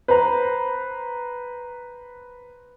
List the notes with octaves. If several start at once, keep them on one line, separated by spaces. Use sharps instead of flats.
B4 C5 A#5